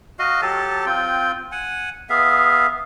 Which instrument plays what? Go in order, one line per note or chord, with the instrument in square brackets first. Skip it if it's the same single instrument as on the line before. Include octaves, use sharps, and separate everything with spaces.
[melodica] F#4 D#5 F5
F#3 G4 A4 A5
C4 F4 G5
F#5 G#5
B3 G#4 E5 F5